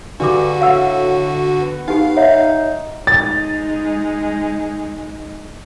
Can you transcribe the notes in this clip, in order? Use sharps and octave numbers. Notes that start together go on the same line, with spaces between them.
G2 D3 D4 F#4 D6
A2 F5 F#5 E6
B3
D#4 G4 F5
D#4 C#5 E5 F#5
G#3 D#4 A6